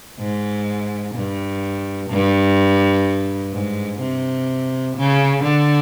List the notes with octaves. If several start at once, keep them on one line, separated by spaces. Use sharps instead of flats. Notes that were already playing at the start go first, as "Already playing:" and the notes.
G#2
G2
G2
G#2
C3
C#3
D3